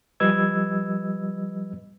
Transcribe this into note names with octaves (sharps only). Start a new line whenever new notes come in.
F3 G3 B4 D#5 E6 G#6